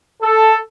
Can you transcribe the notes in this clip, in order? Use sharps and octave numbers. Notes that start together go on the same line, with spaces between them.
A4